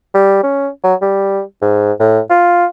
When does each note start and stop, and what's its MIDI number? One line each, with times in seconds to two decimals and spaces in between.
0.14 0.40 55
0.43 0.69 61
0.84 0.95 54
1.02 1.41 55
1.62 1.93 44
2.00 2.20 45
2.30 2.66 65